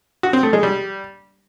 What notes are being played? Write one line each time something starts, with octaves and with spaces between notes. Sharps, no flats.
F#4
C4
A3
G#3
G3